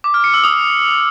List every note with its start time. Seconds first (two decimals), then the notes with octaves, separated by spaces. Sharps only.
0.04 D6
0.14 F6
0.24 C#7
0.34 E6
0.44 D#6